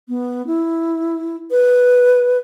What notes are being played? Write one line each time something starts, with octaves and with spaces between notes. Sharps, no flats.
B3
E4
B4